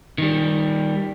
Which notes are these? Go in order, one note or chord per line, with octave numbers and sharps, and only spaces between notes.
D#3 G3